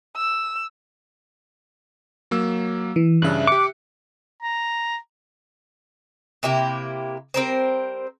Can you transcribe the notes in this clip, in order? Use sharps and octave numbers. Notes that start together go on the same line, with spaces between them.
E6
F#3 A#3 E6
E3
G2 C#3 D4 E5 F#6
G4 D6 C#7
A#5
C3 A#3 E4 G4
G3 C4 A#4 C5